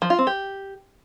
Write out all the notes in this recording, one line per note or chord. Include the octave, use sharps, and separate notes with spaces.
F3
F4
C4
G4